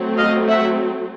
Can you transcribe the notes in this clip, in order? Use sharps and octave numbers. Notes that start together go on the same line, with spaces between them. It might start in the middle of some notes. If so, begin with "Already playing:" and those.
Already playing: F#3 A3 C4
D#5 F5
E5 F#5